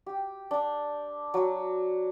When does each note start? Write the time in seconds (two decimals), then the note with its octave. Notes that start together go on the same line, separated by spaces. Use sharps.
0.06 G4
0.51 D4
1.34 F#3